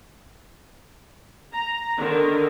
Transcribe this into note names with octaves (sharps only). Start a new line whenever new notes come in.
A#5
D3 D#3